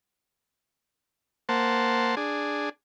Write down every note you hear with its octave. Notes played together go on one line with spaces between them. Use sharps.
A#3 C5 F#5 A5
D4 G#4